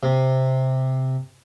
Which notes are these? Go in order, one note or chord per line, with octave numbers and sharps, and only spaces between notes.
C3